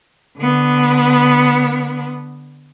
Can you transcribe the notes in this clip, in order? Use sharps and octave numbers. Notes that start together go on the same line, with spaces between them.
D3 B3